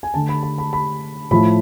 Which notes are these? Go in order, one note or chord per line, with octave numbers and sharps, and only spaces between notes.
G#5
D3 A3 A5
B5
B5
B5
B5
A2 F3 A3 B5